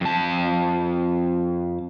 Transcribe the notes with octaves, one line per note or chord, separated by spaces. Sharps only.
F2 A5